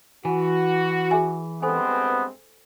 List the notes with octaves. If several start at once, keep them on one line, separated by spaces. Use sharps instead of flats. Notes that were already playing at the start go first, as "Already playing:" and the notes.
E3 F#4 G#5
G#4 E5 G#5
G2 G#3 B3 C4 A4 C5 G#5